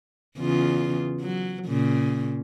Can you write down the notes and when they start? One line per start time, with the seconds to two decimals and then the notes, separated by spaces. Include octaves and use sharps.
0.38 E2 C#3 F4
1.21 F#3
1.66 A#2 C#3